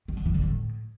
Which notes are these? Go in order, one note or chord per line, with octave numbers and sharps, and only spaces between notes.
D#3
D3
E3
D3
A2